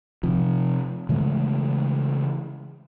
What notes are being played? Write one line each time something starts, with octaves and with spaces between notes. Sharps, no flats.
C3 F3
C#3 E3 G#3 A3